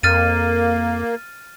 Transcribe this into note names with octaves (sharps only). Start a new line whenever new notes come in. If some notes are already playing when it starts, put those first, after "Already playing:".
F2 A#3 F6 A6 D#7